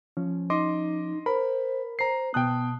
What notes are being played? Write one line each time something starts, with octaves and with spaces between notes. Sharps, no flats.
F3 C#4
D#4 D#5 C6 D6
A#4 C5 B5
C5 A#5 C7
B2 B3 G5 A5 D#6 F#6